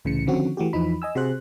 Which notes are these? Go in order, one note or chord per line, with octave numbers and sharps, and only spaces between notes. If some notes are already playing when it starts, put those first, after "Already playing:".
C2 A2 C#3 E3 C#7
D3 D#3 F3 C4 C#4 F#4
E3 A3 F#4 G4
E2 E3 F3 D#4 B5
D#5 G#5 E6
C3 F#4 G#4 C5 F#6